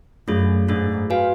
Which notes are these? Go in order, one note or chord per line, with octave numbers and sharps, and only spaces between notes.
F#2 A3 D4 F4 G#4
G#2 A3 D4 F4 G#4
F#4 B4 F5 G#5